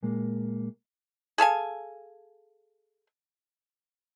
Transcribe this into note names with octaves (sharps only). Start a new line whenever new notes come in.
A#2 G#3 A#3
G#4 A4 F5 G#5